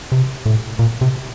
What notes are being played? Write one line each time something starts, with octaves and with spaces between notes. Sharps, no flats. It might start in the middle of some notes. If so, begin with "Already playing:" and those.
C3
A2
A#2
C3